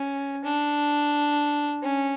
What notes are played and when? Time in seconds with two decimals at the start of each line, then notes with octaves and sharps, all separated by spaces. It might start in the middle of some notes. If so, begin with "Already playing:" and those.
Already playing: C#4
0.44 D4
1.82 C#4